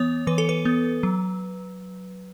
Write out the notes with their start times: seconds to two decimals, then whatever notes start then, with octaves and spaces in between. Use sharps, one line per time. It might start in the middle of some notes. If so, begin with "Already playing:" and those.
Already playing: E3 B3 C#5
0.27 E3 B4
0.38 A4
0.49 B4
0.65 B3
1.03 F#3